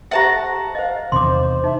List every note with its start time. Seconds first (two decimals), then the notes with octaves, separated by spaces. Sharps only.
0.11 G4 C5 E5 F#5 A5 A#5
0.75 C5 D#5 F5
1.12 E2 C3 D#3 C5 C6 D6
1.64 D#4 E5